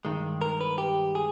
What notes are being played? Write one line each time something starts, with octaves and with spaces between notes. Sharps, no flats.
G2 D#3 G#3
A#4
B4
G4
G#4